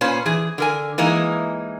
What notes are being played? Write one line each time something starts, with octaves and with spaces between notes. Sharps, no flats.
A#2 C#4 B4 C5
E3 G#4
D3 A#4 G#5
E3 G#3 A#3 D#4